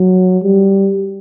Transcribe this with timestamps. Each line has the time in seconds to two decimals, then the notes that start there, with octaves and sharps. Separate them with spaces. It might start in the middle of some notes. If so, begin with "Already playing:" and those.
Already playing: F#3
0.44 G3